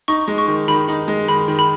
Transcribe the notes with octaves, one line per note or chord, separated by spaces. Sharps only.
D#4 C#6
G#3
C#6
D#3
D#3 B5
D#4
G#3
D#3 B5
D#3
B5